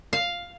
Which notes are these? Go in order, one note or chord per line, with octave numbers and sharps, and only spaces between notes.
F5